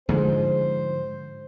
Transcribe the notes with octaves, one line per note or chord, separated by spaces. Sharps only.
G#2 D3 F3 G#3 C5